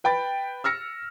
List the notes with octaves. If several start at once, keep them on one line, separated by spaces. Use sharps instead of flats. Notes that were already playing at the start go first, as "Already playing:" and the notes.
B4 G5 B5 A6
E6 F6 A#6 C#7